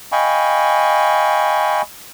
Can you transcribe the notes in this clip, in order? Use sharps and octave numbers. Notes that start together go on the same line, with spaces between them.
D#5 F5 G5 G#5 B5 C#6